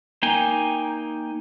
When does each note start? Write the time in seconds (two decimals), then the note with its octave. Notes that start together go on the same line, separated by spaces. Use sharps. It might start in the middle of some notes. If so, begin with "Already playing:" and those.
0.23 A#3 D#4 G5 G#5